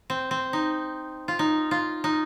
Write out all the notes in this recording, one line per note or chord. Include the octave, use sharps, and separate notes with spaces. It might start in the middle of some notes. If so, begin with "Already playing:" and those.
C4
C4
D#4
F4
D#4
F4
D#4